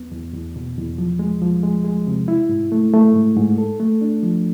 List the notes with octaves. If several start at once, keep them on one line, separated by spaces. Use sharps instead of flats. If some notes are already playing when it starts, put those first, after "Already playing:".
Already playing: E2 B3
E2
E2
B2
E2
F3
G#3
F3
G#3
G#3
C3
E4
G#2
A3
A3
G#2
G#2
A4
A3
D4
F3